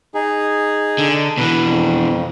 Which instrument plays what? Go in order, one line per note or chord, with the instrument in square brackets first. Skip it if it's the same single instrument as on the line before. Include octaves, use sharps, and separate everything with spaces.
[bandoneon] D#4 G#4
[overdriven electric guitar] D3
[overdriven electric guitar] B2 E3 [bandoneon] B4
[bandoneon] F2